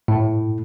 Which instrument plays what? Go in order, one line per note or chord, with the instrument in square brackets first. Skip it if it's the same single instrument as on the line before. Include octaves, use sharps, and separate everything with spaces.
[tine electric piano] A2